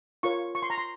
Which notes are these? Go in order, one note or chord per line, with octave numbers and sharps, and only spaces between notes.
F4 A#4 C#5 C#6
C#6
C6
A#5
C6